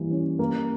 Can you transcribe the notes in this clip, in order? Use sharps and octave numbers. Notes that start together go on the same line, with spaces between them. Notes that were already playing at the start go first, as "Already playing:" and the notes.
Already playing: E3 G3 A#3
C#4
A#3